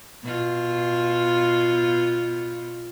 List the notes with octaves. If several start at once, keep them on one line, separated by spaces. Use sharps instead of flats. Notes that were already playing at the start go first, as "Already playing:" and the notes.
B2 F4